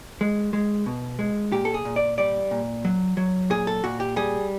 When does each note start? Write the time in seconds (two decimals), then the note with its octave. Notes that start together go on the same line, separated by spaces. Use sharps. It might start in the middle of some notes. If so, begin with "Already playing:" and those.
0.21 G#3
0.53 G#3
0.86 B2
1.19 G#3
1.52 A#2 G4
1.65 A4
1.74 G#4
1.85 A#2
1.96 D5
2.18 G3 D5
2.51 A#2
2.85 F#3
3.17 F#3
3.50 A#2 G#4
3.67 A4
3.84 A#2 F#4
4.00 G4
4.16 G3 G#4